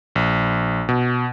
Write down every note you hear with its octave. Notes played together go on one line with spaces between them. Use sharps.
A#1
B2